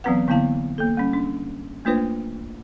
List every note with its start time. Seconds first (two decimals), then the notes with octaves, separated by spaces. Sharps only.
0.04 E3 F#3 B3 C4 B4 F#5
0.28 D3 A#3 B3 E4 F5 A5
0.78 A#3 A4
0.97 G3 C#4
1.13 D4
1.85 A3 A#3 D4 F4 B4 C5